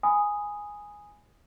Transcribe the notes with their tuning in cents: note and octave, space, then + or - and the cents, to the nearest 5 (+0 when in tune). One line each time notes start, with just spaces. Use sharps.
G#5 -5 B5 +15 D#6 +0